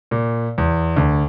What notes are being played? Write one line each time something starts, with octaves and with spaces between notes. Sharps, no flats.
A#2
E2
D2